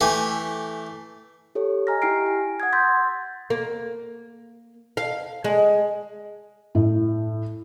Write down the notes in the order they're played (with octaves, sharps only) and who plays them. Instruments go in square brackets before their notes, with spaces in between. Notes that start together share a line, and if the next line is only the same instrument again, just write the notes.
[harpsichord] E3 A3 G4 G#5
[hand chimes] G4 A4 C#5
D#5 G#5 A#5 F6 A#6
E4 G4 G5 F6 C7 D7
G#5
F#5 D#6 G#6
C6 E6 G6 A6 B6
[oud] A#3
F5
G#3
[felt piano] A2